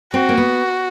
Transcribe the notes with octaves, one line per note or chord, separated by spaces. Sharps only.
C4 F#4
A#3
B3